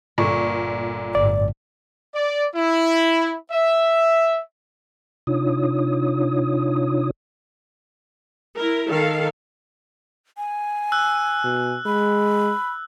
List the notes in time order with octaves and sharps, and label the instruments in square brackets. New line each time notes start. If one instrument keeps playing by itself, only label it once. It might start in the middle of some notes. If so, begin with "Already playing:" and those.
[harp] G1 C#6 E7 [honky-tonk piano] A#2
[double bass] G1 A2 [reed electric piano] D5
[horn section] D5
E4
E5
[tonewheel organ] C3 D4 D#4 F4 C#5 D#6
[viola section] E4 A#4
D#3 A4 F5
[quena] G#5
[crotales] E6 F#6
[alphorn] B2
[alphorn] G#3 [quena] B5